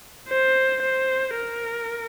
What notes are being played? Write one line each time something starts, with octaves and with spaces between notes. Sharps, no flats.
C5
C5
A#4